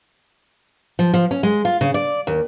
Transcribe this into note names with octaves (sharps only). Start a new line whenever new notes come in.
F3
F3
C#4
G#3
F4
C#3
D5
D#2